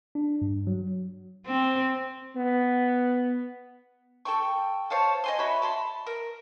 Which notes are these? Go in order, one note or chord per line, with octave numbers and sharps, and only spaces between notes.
D4
G2
F#3
C4
B3
A4 G5 C#6
C5 C#5 F5 A5
D#5 G#5 C6
F#4 C#5 E5 B5
A5 B5 C6
A#4